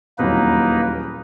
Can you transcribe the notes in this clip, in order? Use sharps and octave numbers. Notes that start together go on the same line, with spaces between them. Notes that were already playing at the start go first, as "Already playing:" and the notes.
D#1 E2 F#3 A#3 D#4 B4